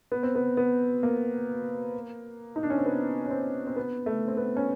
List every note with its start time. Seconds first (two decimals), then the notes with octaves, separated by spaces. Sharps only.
0.12 B3
0.23 C4
0.35 B3
0.57 B3
1.03 A#3
2.56 D#4
2.63 D4
2.70 C#4
2.78 C4
2.86 B3
3.26 C#4
3.31 C4
3.67 C4
3.76 B3
4.06 A3
4.28 C4
4.37 B3
4.57 C#4